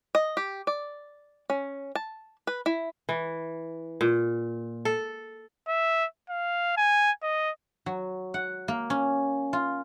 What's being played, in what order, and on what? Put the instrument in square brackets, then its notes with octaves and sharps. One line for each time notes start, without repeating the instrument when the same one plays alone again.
[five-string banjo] D#5
G4
D5
C#4
A5
B4
E4
[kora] E3
A#2
A4
[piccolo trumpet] E5
F5
G#5
D#5
[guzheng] F#3
F#5
A#3
C#4
F4